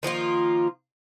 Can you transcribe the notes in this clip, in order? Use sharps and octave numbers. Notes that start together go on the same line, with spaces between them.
D#3 F3 A#3 F4